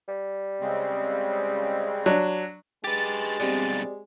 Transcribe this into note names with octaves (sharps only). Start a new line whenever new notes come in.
G3
C#3 G#3 C4
F#3 D4
G#3 G4 B4 D6 A6
G2 B2 C4 G4 D5